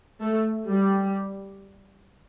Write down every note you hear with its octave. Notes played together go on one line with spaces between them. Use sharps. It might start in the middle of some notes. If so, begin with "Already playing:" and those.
A3
G3